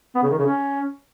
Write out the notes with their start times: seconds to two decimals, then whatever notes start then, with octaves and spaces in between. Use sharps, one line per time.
0.15 B3
0.23 C#3
0.31 D#3
0.38 C#3
0.46 C#4